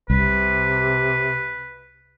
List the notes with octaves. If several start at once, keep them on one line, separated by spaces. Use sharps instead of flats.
C2 C3 B4